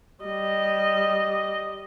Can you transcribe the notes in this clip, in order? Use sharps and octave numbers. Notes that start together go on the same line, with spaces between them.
G3 D#5